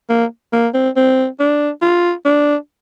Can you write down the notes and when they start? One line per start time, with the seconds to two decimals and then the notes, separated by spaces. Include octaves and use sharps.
0.09 A#3
0.53 A#3
0.74 C4
0.96 C4
1.40 D4
1.82 F4
2.25 D4